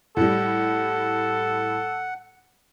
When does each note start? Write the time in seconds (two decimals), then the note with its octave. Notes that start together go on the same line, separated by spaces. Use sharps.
0.17 A2 G3 A4 F#5